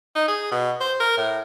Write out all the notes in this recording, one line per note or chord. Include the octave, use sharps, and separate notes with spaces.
D#4
G#4
B2
C5
A#4
A2